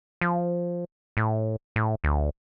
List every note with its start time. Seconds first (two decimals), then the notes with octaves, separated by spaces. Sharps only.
0.21 F3
1.17 A2
1.76 A2
2.04 D2